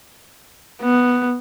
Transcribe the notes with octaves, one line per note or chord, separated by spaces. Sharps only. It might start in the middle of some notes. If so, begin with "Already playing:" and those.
B3